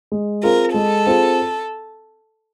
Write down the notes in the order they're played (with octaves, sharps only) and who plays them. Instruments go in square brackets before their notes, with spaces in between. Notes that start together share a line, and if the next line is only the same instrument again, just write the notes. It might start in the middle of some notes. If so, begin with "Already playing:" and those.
[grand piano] G#3
[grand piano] C4 F4 G#4 [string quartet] A#4
[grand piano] G#3 [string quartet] A4
[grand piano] C4 F4 G#4